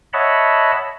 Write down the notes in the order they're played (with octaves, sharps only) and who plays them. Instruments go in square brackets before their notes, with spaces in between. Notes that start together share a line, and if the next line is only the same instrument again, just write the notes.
[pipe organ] C#5 D#5 E5 F#5 A5 B5